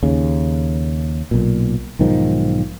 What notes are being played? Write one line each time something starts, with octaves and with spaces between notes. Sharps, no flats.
D#2 C#3
B1 A#2
B1 G#2 D#3 F3